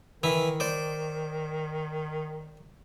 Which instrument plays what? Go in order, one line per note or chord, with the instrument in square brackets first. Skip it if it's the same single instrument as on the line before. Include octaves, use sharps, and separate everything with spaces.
[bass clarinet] D#3 [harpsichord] E3 E4
[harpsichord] C5 D5